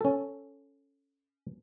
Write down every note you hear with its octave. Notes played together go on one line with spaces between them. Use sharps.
C#4 A4